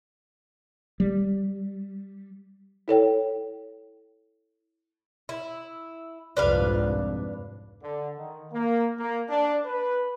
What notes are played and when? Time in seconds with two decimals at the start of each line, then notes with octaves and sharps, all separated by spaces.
1.00 G3
2.88 E4 A4 C#5 G5
5.29 E4
6.37 C2 F2 G#2 D4 B4 F5
7.83 D3
8.18 D#3
8.53 A#3
8.98 A#3
9.30 D4
9.66 B4